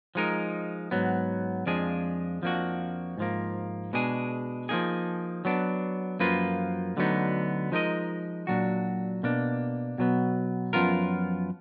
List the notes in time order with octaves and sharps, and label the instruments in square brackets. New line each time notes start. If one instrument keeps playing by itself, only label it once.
[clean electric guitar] F3 G#3 D#4 A#4
G#2 F#3 B3
F2 F3 G#3 D4 G#4
F2 F3 A#3 D4 F#4
G#2 F3 A#3
B2 G#3 D4 G#4
F3 A#3 D#4 G#4
F#3 B3 D4
F#2 F3 A#3 F4 B4
D2 D3 F#3 B3 D#4
F3 G#3 D#4 A#4 D#5
A#2 F#3 D4 F#4
B2 A#3 D4
B2 F#3 B3
F#2 F3 B3 F4 A#4